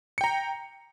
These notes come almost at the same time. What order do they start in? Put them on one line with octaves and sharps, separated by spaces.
C#7 G5 A#5